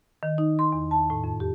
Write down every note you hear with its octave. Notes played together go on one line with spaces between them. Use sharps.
D#3
D#4
C6
E2
A5
A2
F2
G4